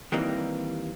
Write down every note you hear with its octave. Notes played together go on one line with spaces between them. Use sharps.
D#3 E3 G3 A#3 C4